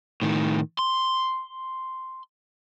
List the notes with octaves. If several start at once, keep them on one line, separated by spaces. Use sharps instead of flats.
A2 D#3
C6